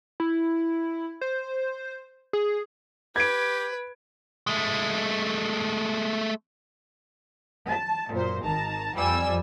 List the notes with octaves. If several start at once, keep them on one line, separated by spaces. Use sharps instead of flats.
E4
C5
G#4
G4 B4 G#6 D7
G#3 A3
A5
F#2 A#2 C5
G#1 D#3 A5 A#5
F2 F3 G3 G#5 E6